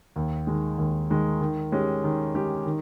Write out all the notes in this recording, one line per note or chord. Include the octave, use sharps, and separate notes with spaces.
D#2
D#3 G#3
D#2
D#3 G#3
D#3
G#3 C#4 G4
D#3
G#3 C#4 G4
D#3